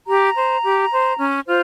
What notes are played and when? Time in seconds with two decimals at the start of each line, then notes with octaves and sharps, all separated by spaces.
0.08 G4 A#5
0.36 C5
0.63 G4
0.92 C5
1.19 C#4
1.47 F4 C5